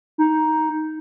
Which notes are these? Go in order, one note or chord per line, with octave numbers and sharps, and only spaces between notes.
D#4